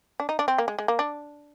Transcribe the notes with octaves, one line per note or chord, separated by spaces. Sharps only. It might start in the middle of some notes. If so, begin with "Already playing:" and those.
D4
D#4
D4
C4
A#3
G#3
G#3
A#3
D4